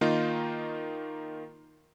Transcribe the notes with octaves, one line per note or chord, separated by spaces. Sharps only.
D#3 A#3 D#4 F4